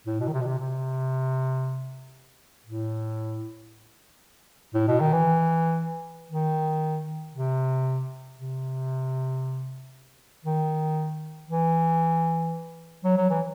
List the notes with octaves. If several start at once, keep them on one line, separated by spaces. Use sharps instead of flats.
A2
B2
D#3
C3
B2
C3
C3
A2
A2
B2
D#3
E3
D#3
C3
C3
D#3
E3
F#3
F#3
E3